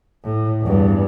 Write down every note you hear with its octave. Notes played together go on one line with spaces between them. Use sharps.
A2
E2 G2